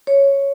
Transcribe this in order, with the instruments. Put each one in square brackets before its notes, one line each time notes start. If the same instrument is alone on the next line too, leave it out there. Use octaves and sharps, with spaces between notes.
[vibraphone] C#5